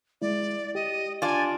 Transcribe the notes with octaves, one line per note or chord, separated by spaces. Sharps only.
G#3 E4 D5
G4 D#5
D4 F4 G#5